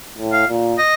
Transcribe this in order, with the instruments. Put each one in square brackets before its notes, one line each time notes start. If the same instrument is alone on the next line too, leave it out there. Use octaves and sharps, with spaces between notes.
[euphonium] A2
[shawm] F5
[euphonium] A#2
[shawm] D#5